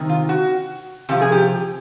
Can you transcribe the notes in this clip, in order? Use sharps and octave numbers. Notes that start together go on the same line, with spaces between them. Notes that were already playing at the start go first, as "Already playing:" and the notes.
Already playing: C3 D#3
F4
F#4
C3 F3 G4
G#4
G4